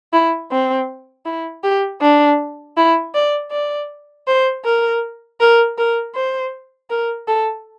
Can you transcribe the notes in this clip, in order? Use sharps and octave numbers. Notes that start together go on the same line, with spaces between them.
E4
C4
E4
G4
D4
E4
D5
D5
C5
A#4
A#4
A#4
C5
A#4
A4